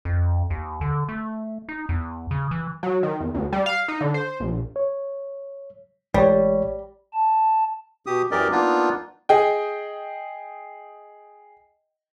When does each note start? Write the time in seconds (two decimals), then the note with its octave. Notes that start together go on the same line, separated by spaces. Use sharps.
0.05 F2
0.50 D#2
0.81 D3
1.09 A3
1.69 D#4
1.89 E2
2.31 C#3
2.51 E3
2.83 F#3
3.03 D#3
3.20 E2
3.34 D2
3.53 G3
3.66 F5
3.88 D#4
4.01 D3
4.14 C5
4.40 A#1
4.76 C#5
6.14 A1 G3 G#3 C#5
7.14 A5
8.06 B2 G4 D#6
8.31 F#2 E3 G4 A#4 D5 D#5
8.52 A#3 B3 D4 D#4 F4
9.29 G#4 D#5 G5